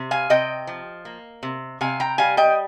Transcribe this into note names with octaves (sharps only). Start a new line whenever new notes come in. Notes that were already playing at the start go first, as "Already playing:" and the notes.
Already playing: C3
F5 G#5
C3 D#5 G5
F3
A#3
C3
C3 F5 G#5
G5 A#5
G3 F5 G#5
D#5 G5